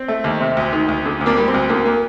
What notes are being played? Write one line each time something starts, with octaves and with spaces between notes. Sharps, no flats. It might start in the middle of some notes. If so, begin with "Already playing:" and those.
Already playing: C4
A3
D#2
C3
D2
D#3
D2
D3
D2
A#3 D4
G3
C4
D2
D3 A#3
A#3